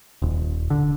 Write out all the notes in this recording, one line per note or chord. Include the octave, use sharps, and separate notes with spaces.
D#1
D3